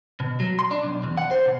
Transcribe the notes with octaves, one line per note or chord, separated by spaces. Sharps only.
B2
F#3
C6
D4
B1
E2
F#5
C5
B2